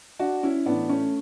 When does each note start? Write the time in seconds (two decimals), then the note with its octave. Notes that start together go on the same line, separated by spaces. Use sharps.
0.19 D4 F#4
0.43 C#4 E4
0.66 A2 E3 B3 D4
0.89 A3 C#4